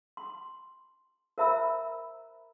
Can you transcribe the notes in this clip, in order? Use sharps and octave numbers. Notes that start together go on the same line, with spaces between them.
C6
A#4 C5 E5 A#5 B5 E6